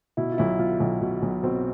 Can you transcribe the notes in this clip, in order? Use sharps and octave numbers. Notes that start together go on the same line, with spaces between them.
B2 E4
F4
B1 E4
B2 F4
B1
B2
B1
B2 C4